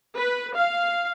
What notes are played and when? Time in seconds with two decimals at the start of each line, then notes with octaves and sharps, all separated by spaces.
0.16 B4
0.55 F5